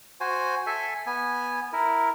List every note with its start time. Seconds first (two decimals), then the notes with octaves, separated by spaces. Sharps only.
0.21 F#4 C5 G#5
0.67 A4 E5 G#5
1.06 B3 G#5
1.73 E4 A#4